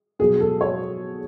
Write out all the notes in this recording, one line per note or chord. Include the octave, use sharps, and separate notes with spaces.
B2 F#3 G#4
A4
C#5